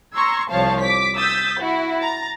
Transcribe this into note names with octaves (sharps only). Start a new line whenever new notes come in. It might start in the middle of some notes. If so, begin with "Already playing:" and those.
A#5 C6 C#6 E6 G#6
C2 F3 C#5 F5 A5
D6 B6
D#6 E6 G6 A6 B6
E4 F#4
A#5 A6